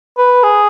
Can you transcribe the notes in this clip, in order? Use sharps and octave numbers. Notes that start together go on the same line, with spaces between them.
B4
G#4